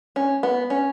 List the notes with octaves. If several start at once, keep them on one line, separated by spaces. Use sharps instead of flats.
C#4
B3
C#4